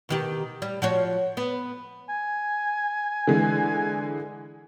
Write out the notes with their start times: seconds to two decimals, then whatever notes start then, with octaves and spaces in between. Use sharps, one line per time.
0.09 B2 D#3 G4
0.62 G3
0.82 F3 F#4 C#5
1.37 B3
2.09 G#5
3.27 D3 E3 G#3